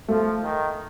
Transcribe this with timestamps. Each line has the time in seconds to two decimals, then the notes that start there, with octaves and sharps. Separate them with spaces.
0.08 F3 A3
0.43 D#3